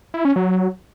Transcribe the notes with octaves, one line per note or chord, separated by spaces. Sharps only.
E4
C#4
F#3